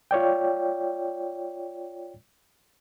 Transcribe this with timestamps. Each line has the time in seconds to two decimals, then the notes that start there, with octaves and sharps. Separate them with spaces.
0.11 F4 C#5 D5 G5